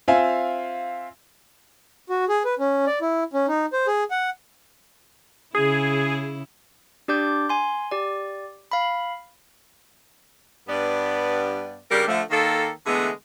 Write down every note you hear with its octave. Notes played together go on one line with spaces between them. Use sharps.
C4 F4 E5 F5 G#5
F#4
G#4
B4
C#4
D5
E4
C#4
D#4
C5
G#4
F#5
C#3 E4 G#4
D4 G4 D5 D6 G6
G#5 C6
G4 D5
F5 B5
G2 B3 D5
C#3 G3 D4 G4 A#4
D3 F3 A3
D#3 A#3 A4
D3 E3 G#3 A3 B3 G#4